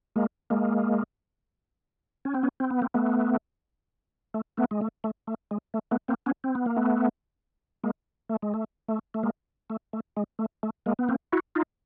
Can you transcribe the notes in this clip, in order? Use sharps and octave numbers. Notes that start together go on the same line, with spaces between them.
G#3 A#3
G#3 A#3
C#4
C4
B3 C#4
C4
B3
A#3 C4
A3 B3
A3
A3 B3
G#3
A3
A3
A3
G#3
A3
A3 B3
A#3 C4
B3 C#4
C4
B3
A#3
A3 B3
G#3 A#3
A3
G#3
A3
A3
A3
G#3 A#3
A3
A3
G#3
A3
A3
G#3 A#3
B3
A#3 C4
E4 F#4
D#4 F4